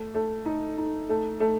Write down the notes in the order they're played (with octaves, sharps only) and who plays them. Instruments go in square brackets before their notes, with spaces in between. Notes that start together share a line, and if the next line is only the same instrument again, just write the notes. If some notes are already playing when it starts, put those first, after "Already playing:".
Already playing: [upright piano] A3
A3
D#4
D#4
A3
A3